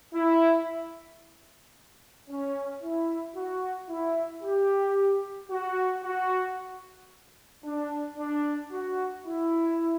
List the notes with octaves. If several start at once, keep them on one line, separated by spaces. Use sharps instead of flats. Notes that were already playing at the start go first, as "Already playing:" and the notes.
E4
C#4
E4
F#4
E4
G4
F#4
F#4
D4
D4
F#4
E4